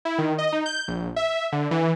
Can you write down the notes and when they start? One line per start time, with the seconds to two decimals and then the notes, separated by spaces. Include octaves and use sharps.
0.05 E4
0.18 D#3
0.38 D#5
0.52 D#4
0.66 G6
0.88 A#1
1.16 E5
1.52 D3
1.71 E3